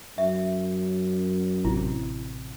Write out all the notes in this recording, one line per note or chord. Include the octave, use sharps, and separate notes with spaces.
F#2 E5
A1 C3 E4